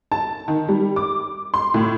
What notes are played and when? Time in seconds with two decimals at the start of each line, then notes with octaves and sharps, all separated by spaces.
0.12 A5
0.48 D#3
0.69 G3
0.96 D6
1.54 C6
1.74 A2